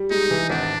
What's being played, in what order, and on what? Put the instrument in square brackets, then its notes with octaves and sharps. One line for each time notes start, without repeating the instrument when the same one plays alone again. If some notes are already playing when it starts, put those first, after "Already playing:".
Already playing: [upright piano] G3
[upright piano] G#3 [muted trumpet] D#4
[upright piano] E3
[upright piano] G#1 [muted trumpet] D4